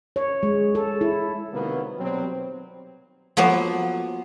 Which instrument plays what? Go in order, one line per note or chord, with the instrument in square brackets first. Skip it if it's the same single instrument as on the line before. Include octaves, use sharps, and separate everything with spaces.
[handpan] C#5
G#3
A4
E4
[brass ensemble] C3 D#3 F#3 A#3 B3
B2 F#3 G3 C4
[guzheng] F3 F#3 A#3 B3